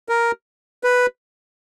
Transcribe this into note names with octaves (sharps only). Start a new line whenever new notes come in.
A#4
B4